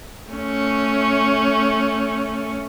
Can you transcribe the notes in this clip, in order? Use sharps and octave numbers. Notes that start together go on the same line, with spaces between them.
A3 C#4